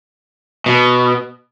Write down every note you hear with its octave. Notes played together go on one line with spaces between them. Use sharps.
B2